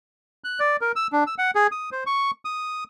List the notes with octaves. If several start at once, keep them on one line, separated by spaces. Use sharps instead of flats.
F#6
D5
A#4
E6
D4
E6
F#5
G#4
D#6
C5
C#6
D#6